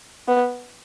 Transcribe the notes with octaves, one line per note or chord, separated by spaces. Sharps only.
B3